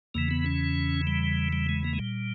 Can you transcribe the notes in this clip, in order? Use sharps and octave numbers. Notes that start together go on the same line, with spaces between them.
E2 C#3 E3 A#3
B3
C#4
G3
G3
G#3
A#3
G#3
A#2 G3